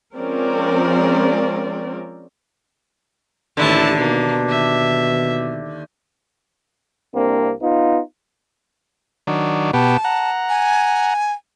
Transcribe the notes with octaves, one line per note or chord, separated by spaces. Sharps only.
F3 G#3 C4 C#4 A#4 D5
A1 D#2 D3 E4 A5
B2 A#3
E5
C2 A#3 C4 D4
B3 D#4 F4
D#3 F#3 D4
B2 B3 G4 A5
F#5 A#5
G#5